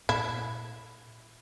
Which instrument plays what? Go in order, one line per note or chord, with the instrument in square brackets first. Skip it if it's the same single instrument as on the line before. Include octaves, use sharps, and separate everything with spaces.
[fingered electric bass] A#2 [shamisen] E4